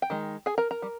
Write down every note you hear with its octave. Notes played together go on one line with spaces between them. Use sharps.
G5
D#3 G#3
G#4 G#5
A#4 A#5
A#4 A#5
G3